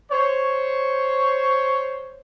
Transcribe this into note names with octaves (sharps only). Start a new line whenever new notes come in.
C5 C#5